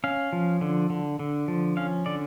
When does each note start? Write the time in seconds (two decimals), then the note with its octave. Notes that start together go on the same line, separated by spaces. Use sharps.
0.04 C#4 F5
0.33 F3
0.61 D3
0.90 D3
1.19 D3
1.48 F3
1.77 C#4 F5
2.06 D3 D5